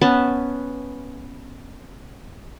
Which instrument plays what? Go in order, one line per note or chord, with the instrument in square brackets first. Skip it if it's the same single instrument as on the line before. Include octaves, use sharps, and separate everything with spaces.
[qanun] B3 C#4 A5